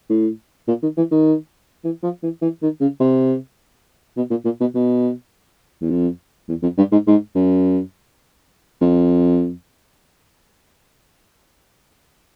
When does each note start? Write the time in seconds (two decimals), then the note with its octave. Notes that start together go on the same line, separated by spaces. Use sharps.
0.10 A2
0.68 A#2
0.83 D#3
0.97 E3
1.11 D#3
1.84 E3
2.03 F3
2.23 E3
2.42 E3
2.62 D#3
2.80 C#3
3.00 C3
4.17 B2
4.30 A#2
4.45 A#2
4.60 B2
4.75 B2
5.81 E2
5.90 F2
6.48 E2
6.63 F2
6.77 G2
6.92 G#2
7.07 G#2
7.35 F#2
8.81 F2